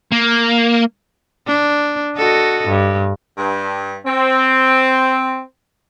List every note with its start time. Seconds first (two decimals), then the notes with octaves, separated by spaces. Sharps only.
0.12 A#3
1.47 D4
2.17 F#4 A4 D#5
2.68 G2
3.38 G2
4.06 C4